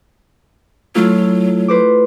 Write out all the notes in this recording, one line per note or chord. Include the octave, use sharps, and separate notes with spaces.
F#3 A3 E4 F4
B4 C5 D6